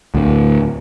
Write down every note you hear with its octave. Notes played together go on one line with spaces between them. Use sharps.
D2 A2